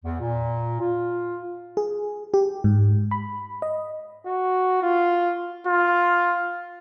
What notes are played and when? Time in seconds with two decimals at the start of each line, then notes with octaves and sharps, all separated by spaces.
0.05 E2
0.20 A#2
0.80 F4
1.77 G#4
2.34 G4
2.64 G#2
3.11 B5
3.62 D#5
4.26 F#4
4.83 F4
5.67 F4